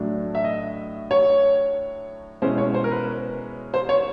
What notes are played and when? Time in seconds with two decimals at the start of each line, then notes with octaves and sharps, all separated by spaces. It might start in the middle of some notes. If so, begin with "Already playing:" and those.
Already playing: A2 F#3 A3 D4
0.35 E5
0.44 D#5
1.11 C#5
2.42 B2 G#3 C#4 E4 C5
2.58 C#5
2.74 C5
2.84 A#4
2.91 B4
3.74 C5
3.89 C#5